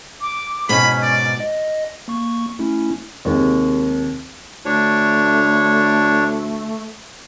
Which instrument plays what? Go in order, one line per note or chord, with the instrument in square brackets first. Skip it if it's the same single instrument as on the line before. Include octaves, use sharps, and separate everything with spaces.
[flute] D6
[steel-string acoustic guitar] G#2 B2 [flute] C#4 [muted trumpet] B5
[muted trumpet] D5
[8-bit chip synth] D#5
A#3 C#6
A3 C#4 E4
[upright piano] D#2 C3 G#3 A#3
[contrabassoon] D2 [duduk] A3 [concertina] D4 C#5